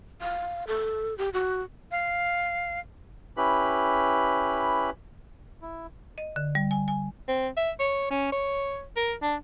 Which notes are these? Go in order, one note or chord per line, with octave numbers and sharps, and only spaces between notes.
F5
A4
G4
F#4
F5
C#4 E4 G4 B4 B5
E4
D#5
D3
G3
G#5
G#5
C4
E5
C#5
C#4
C#5
A#4
D4